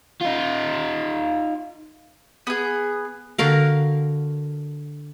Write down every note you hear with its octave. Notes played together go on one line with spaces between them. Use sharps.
D#4 F4
B3 G#4
D3 F#4 A#4 F5